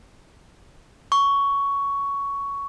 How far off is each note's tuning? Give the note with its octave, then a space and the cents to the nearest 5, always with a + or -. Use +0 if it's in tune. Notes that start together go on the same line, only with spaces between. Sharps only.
C#6 +10